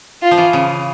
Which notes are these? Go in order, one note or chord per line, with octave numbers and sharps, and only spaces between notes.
F4
F3
E3
C#3